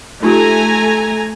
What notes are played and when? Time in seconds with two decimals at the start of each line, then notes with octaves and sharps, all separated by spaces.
0.23 A3 D#4 F4 G4 G#5 A#5